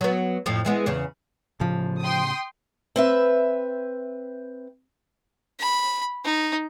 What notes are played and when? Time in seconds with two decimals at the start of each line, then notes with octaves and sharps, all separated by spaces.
0.01 F#3 B3
0.46 F2 A2 F3
0.65 E3 G#3 B3
0.86 E2 C#3
1.61 A2 C#3 F3
2.00 G5 C6 D#6
2.96 C4 B4 E5
5.60 B5
6.25 D#4